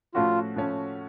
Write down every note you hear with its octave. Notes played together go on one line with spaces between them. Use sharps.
A2 F3 A3 C#4 F4 F#4
A2 F3 A3 C#4